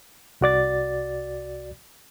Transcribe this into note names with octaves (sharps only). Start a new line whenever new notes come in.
C2 F#4 D5 A6